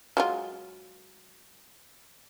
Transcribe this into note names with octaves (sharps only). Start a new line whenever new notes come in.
F#3 G#3 F4